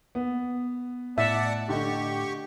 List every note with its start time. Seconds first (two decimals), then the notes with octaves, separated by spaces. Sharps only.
0.15 B3
1.18 A2 D5 E5 F#5 A5
1.69 D3 G4 D#5 C#6